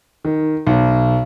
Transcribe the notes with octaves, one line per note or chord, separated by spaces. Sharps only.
D#3
B1